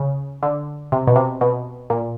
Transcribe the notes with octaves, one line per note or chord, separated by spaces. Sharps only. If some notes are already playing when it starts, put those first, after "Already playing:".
Already playing: C#3
D3
C3
B2
C3
B2
A#2